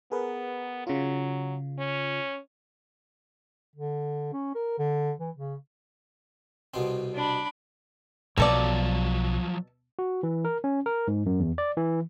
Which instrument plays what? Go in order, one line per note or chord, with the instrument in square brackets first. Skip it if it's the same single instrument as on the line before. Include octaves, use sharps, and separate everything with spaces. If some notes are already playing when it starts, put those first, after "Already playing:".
[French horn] B3 [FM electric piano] G#4 A#4 B4
[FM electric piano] C#3 F4 [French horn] F#3
[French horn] C#4
[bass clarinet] D3
C#4
A#4
D3
E3
C#3
[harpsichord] C2 B2 C4
[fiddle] D4 B5
[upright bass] B1 [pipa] B2 A4 D5 [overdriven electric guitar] F3 F#3
[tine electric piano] F#4
E3
A#4
C#4
A#4
G#2
F#2
E2
D5
E3